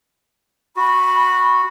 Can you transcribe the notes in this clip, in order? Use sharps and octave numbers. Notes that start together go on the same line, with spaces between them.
F#4 B5